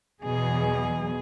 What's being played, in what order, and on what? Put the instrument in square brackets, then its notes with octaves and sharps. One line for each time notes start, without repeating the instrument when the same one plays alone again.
[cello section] E2 B2 F#3 G#4